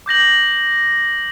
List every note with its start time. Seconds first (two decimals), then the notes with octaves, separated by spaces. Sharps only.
0.06 D6 G6 A#6 F#7